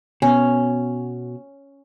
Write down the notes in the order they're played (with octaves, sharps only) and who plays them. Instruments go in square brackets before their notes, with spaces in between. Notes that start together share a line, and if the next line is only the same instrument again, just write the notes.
[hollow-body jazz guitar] B2 [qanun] C#4